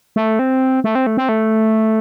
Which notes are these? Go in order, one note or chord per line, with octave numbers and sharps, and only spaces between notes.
A3
C4
A3
C4
A3
C4
A3